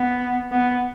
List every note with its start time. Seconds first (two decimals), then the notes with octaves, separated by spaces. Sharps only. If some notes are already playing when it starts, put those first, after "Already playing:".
Already playing: B3
0.51 B3